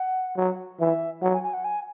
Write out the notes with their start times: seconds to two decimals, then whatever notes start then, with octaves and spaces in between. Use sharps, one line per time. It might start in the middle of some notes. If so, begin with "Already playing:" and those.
Already playing: F#5
0.37 F#3
0.79 E3 E5
1.22 F#3 F#5
1.33 G#5
1.43 G#5
1.54 F#5
1.64 G#5